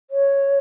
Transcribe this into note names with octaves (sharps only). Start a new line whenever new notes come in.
C#5